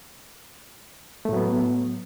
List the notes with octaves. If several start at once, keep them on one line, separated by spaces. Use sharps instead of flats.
A2 F#3 A3 B3